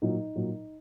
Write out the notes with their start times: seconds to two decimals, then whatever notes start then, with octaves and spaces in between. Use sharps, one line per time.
0.02 A#2 F#3 D#4
0.36 A#2 F#3